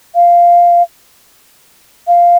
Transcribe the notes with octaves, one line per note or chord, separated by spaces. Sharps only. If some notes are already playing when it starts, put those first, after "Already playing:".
F5
F5